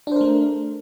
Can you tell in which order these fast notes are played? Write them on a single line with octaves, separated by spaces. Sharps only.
D4 C5 A#4 A3